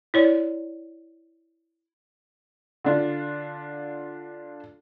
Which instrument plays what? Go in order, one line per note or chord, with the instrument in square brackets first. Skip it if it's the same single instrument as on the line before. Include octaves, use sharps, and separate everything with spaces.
[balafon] E4 C#5 D5
[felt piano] D3 D4 F4